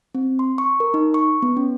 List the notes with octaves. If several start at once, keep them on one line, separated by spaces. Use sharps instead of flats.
C4
C6
C#6
A#4
D#4
C#6
B3
C#4